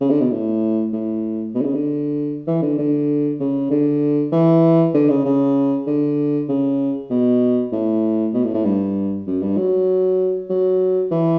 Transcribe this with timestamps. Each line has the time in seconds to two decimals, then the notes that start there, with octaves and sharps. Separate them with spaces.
0.01 C#3
0.10 D3
0.21 B2
0.31 A2
0.93 A2
1.55 B2
1.61 D3
1.65 C#3
1.75 D3
2.47 E3
2.63 D3
2.78 D3
3.40 C#3
3.71 D3
4.32 E3
4.94 D3
5.10 C#3
5.25 C#3
5.87 D3
6.49 C#3
7.10 B2
7.72 A2
8.34 B2
8.44 A2
8.54 A2
8.65 G2
9.27 F#2
9.42 G2
9.58 F#3
10.50 F#3
11.11 E3